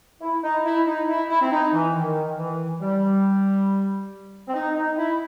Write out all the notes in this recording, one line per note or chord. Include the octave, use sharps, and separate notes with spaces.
E4
D#4
E4
D#4
E4
E4
C4
D#4
E3
D#3
E3
G3
C4
D#4
D#4
E4